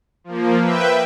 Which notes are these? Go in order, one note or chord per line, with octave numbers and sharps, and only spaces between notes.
F3 A#3
B4 E5 G5